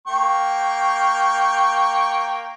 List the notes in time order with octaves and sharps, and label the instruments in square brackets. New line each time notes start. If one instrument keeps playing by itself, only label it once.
[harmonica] A#3 G5 C#6